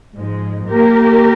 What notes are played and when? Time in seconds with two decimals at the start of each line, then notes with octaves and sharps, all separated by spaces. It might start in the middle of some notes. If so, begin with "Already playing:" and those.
0.15 G#2 F3 G#3
0.69 A#3 G4 A#4